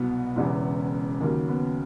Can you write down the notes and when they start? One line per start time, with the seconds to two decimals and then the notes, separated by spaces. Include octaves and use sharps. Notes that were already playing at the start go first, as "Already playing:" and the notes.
Already playing: C2 B2 F#3 B3
0.36 E1 E2 C#3 E3
1.20 D#2 C#3 F#3 A#3
1.48 B3